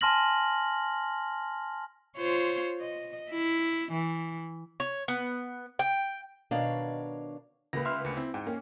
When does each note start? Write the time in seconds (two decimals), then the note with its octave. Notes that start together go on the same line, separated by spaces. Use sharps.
0.01 G#5 A5 C6 F6 A#6 F#7
2.17 F4 C5 C#5
2.81 D#5
3.30 E4
3.92 E3
4.80 C#5
5.08 B3
5.79 G5
6.51 B2 D#3 D4 C#5 F5
7.73 C#2 A#3 B4 A#6
7.85 E5 C6 F6
8.05 D2 C#7
8.16 C4 E4
8.34 G#2 G5
8.47 A#3 C#4